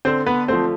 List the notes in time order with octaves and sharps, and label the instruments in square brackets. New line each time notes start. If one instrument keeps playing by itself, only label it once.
[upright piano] D3 [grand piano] C4 C5
[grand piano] B3 B4
[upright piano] F3 A3 [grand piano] C4 C5